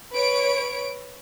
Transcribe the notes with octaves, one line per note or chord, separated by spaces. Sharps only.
B4 C#5 D7